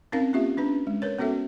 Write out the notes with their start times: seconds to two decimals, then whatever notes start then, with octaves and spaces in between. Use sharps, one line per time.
0.12 C4 C#4 D#4 A#4 F5
0.33 A#3 C#4 F4 G4 E5
0.57 C#4 D4 B4
0.87 G#3
1.02 A#4 B4 C#5
1.18 B3 C#4 F#4 A4 E5